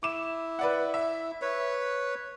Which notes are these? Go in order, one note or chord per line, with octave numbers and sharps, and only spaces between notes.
E4 D6 E7
B4 D5 F#5
E5
B4 C#5